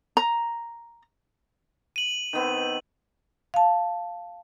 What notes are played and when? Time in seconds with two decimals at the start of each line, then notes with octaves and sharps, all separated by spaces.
0.17 A#5
1.96 D#7 F#7
2.33 D#3 B3 C4
3.54 F5 A5